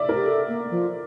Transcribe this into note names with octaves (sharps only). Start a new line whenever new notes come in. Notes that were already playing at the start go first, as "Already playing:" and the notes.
Already playing: D5 E5
A#4
G4
A4
A#3
F3